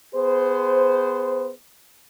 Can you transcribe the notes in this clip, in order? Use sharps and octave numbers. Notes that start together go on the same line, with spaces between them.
B3 G#4 C5